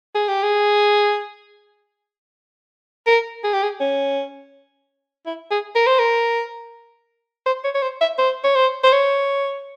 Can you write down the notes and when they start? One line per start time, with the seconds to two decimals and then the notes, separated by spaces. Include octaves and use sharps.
0.15 G#4
0.28 G4
0.43 G#4
3.07 A#4
3.44 G#4
3.53 G4
3.63 G#4
3.80 C#4
5.26 E4
5.51 G#4
5.75 A#4
5.87 C5
5.99 A#4
7.46 C5
7.64 C#5
7.75 C#5
7.82 C5
8.01 E5
8.18 C5
8.44 C#5
8.55 C5
8.84 C5
8.92 C#5